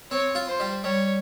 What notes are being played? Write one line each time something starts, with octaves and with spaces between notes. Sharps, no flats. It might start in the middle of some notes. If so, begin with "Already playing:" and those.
C4 C#5
F4
C5
G3
G3 C#5